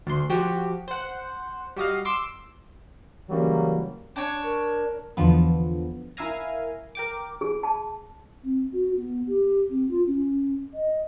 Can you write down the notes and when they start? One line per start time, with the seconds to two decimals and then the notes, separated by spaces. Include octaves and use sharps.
0.07 D2 C6
0.29 F3 F#4 G4
0.88 C5 F#5
1.77 G3 F#4 D#5 F5
2.05 C6 D6 E6
3.29 C#3 E3 F#3 G3 A#3
4.16 D4 C#5
4.43 A#4
5.17 E2 D3 F3 B3
6.17 E4 A#4 E5 F5 G#5 A#5
6.95 A#4 G5 D6
7.41 G#4
7.63 A5
8.44 C4
8.73 F#4
8.96 B3
9.28 G4
9.70 C4
9.90 F4
10.07 C#4
10.74 D#5